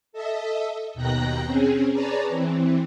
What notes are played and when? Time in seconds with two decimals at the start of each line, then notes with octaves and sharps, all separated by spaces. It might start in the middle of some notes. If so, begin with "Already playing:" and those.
0.13 A4 D#5 E5
0.94 D#2 B2 G5 A#5 F#6 A#6
1.46 C4 C#4 G#4
1.92 G#4 B4 C#5 D5 A5 A#5
2.29 E3 C4